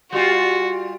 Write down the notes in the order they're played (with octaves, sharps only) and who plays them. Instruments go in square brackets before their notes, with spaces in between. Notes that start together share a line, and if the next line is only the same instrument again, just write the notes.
[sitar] G3 F4 [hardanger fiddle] F#4